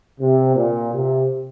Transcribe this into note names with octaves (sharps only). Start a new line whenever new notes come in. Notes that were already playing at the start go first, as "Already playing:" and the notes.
C3
A#2
C3